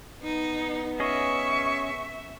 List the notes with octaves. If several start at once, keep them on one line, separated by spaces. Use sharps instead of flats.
B3 D#4
C#4 G#4 D#5 E5 C#6